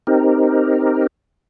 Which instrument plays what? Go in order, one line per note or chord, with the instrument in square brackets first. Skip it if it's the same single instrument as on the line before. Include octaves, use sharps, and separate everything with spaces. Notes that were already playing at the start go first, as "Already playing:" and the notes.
[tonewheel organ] C4 D#4 G4 A#4